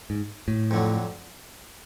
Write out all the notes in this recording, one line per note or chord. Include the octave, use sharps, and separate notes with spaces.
G#2
A2
F2 D3 F#3